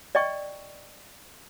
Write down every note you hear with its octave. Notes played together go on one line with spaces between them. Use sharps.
D5 D#5 G5 C#6